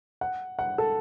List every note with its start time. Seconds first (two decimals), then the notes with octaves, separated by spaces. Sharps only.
0.21 F#5
0.59 F#5
0.78 A4